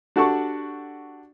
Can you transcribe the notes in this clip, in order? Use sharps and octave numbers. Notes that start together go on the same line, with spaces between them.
D4 F#4 G4 A4 A5 C#6